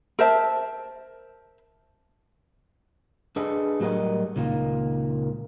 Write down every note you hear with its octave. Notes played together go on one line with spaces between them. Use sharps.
A#4 C5 E5 A5
D4 G#4 A4 B4 D#5
A2 F#3 G3 A4 A#4 D#5
C#2 A#2 D#3 A#3